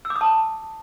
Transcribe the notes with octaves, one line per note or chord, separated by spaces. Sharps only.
E6
D6
D#6
A5